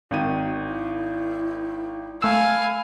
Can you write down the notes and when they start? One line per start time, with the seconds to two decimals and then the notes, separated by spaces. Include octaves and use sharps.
0.11 G#1 D#3 F#4 D#7
0.65 E4
2.22 A3 F5 G#5 B5 E6